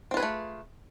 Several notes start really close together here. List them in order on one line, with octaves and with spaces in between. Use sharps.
C4 F4 B4 G#4 A3